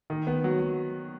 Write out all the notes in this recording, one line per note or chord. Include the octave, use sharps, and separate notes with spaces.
D#3
B3
F#3
F#3